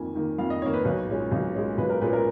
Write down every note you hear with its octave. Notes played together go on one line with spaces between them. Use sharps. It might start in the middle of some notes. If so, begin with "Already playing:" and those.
Already playing: F2 D#3 A#3 G#5
D#3 A#3
F2 F5
D#5
D#3 A#3 C#5
B4
B1 C#5
A#2 G#3 C#4
B1
A#2 G#3 C#4
B1 B4
A#4
A#2 G#3 C#4 B4
A#4